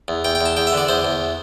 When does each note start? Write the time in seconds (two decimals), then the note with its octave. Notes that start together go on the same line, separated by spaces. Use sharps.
0.08 E2
0.24 E2 G5
0.35 G5
0.41 E2 A5
0.57 E2 G5
0.67 E5
0.72 D3
0.77 D5
0.88 E2 C5
1.05 E2